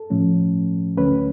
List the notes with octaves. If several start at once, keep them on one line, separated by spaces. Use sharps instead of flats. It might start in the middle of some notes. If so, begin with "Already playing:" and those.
Already playing: A4
A2 F3 A3 C#4
D2 D3 F#3 A3 C#4 B4